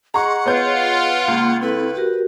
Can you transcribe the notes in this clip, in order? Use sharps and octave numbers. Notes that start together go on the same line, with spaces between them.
G#4 D#5 F#5 A#5 C6 C#6
B3 F4 C#5 G6
C#2 A#3
C4 E4 A4 B4
F#4 G4 A#4